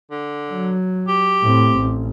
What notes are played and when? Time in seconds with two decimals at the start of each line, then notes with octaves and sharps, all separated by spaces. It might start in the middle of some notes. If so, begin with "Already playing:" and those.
0.11 D3
0.51 F#3
1.08 G4
1.43 A2 C4
1.79 A1